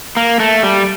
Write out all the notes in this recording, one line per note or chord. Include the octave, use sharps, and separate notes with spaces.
A#3
A3
G3